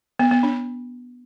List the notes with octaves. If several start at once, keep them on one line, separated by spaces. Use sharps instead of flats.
B3
B3
D4